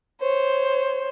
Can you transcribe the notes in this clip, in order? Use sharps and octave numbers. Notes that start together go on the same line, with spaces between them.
C5 C#5